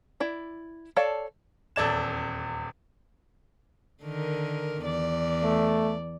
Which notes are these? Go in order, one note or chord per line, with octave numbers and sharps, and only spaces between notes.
E4 D5
A4 C#5 D5 F5 A5
D#1 E2 A4 D5 G#6 E7
D3 D#3 A#4
E2 D5
A3